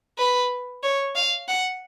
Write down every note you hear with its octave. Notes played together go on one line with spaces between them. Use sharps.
B4
C#5
F5
F#5